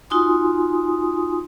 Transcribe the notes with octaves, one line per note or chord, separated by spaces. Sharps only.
D#4 F4 F#4 G#5 C6 D#6